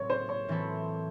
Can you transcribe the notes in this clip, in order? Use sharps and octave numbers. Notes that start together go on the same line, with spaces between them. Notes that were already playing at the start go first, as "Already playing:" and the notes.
Already playing: A2 F#3 C4 C#5
C5
C#5
A2 E3 C4 E4 A4